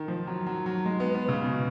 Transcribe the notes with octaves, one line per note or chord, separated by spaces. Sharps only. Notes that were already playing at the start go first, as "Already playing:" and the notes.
Already playing: D#3
F3
F#3
F#3
F#3
G#3
B3
B3
C#3
B2